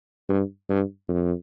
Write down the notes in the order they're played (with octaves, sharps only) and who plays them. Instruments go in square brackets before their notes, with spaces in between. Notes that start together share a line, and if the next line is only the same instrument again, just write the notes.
[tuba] G2
G2
F2